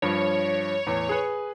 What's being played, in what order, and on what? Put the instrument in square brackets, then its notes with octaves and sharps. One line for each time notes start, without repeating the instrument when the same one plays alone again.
[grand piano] G2 F3 [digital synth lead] C#5
[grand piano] E2 A2
G#4 B4